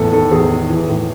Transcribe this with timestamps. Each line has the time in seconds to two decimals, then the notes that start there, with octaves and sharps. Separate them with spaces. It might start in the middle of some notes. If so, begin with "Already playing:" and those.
Already playing: E2 A2 A4
0.12 D#3 A4
0.31 E2 G#4
0.50 D#3
0.70 E3
0.89 A2